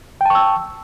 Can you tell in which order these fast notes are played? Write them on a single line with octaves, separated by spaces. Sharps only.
G5 A5 C#6 E6